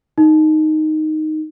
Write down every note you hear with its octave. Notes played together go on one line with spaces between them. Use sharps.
D#4